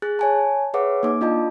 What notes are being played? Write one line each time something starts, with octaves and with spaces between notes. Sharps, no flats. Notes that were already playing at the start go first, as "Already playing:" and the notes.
G#4 F#6 A6
C#5 G#5 A5
G#4 B4 C#5 E5 F#5 D6
A#3 D#4 D6
D4 F4 D#5 A5